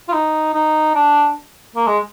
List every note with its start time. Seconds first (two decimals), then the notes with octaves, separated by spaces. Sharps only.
0.09 F4
0.13 D#4
0.54 D#4
0.95 D4
1.76 A#3
1.87 G#3